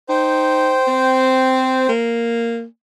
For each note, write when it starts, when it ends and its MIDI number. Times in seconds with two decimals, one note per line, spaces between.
0.09 0.80 63
0.09 1.90 72
0.09 1.90 79
0.88 1.86 60
1.89 2.65 58